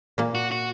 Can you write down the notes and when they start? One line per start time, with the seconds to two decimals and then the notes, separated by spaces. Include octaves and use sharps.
0.18 A#2 A#3
0.35 F#4
0.51 F#4